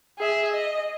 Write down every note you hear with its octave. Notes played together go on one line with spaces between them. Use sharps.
G#4 E5
D#5